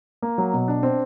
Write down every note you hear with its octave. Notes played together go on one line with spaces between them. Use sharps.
A#3
F#3
B2
D4
C4